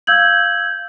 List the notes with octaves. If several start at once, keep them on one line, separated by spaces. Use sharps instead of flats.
F5 E6 G6 G#6 F#7